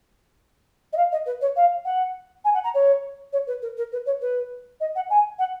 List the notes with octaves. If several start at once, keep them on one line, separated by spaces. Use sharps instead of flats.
D#5
F5
D#5
B4
C#5
F5
F#5
G#5
F#5
A#5
C#5
C#5
B4
A#4
A#4
B4
C#5
B4
D#5
F#5
G#5
F#5